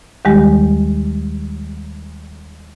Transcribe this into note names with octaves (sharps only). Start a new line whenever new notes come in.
D#2 D#3 G3 G#3 G4